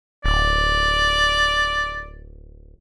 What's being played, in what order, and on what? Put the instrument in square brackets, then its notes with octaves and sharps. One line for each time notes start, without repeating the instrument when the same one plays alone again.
[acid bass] D1 [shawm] D5